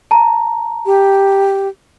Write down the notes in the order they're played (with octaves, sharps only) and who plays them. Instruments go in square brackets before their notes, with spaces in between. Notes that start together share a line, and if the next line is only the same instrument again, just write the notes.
[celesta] A5 A#5
[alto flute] G4